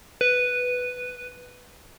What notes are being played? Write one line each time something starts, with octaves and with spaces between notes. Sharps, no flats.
B4